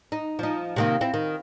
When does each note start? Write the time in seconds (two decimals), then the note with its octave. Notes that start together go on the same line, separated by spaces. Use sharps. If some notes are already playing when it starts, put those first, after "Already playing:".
0.12 D#4
0.39 F3 D#4
0.76 C3 D#3 A#3
1.01 C4 E4
1.14 D#3